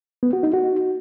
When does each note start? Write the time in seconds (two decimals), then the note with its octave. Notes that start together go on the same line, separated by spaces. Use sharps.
0.23 B3
0.33 F#4
0.43 D#4
0.54 F#4